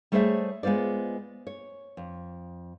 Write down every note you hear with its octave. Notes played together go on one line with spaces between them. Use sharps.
G3 A3 G#4 C5 C#5 E5
G#3 B3 F4 C5 D5
C#5
F2